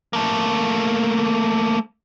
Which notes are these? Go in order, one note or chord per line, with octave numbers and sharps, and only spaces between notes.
A3 A#3